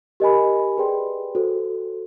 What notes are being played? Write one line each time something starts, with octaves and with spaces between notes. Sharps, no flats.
G4 A#4 D#5 G#5 B5
G#4 B4 D5 G5 C6
F#4 A4 C5